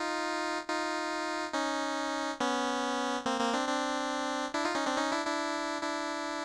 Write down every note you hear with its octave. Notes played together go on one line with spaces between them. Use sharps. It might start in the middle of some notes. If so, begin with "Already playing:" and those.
Already playing: D#4 F4
D#4 F4
C#4 D#4
B3 C#4
A#3 C4
A#3 C4
C4 D4
C4 D4
D4 E4
D#4 F4
C#4 D#4
C4 D4
C#4 D#4
D4 E4
D4 E4
D4 E4